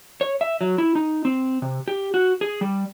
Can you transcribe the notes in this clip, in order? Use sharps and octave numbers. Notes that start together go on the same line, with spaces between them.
C#5
E5
F#3
E4
D#4
C4
C3
G4
F#4
G#4
G3